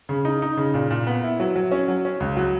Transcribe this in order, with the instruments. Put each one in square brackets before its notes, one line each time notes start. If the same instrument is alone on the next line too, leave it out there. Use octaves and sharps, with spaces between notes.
[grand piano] C#3
D#4
D#4
C#3
A#2
A#2
B3
E4
F#3
F#3
C#4
F#3
C#4
C#2
F#3